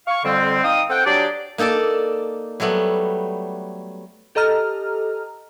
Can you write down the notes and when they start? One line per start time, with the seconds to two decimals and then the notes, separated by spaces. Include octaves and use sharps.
0.07 F5 C#6
0.24 F2 D3 G3 C4
0.64 D#4 F5 G5 D#6
0.90 C4 A4 F#5 G5
1.05 F#3 D4 G4 G#4 D5
1.58 A#3 D#4 A4 D5 A5
2.60 F#3 G3 A3 B3
4.35 G4 A4 D#5 A#5 F6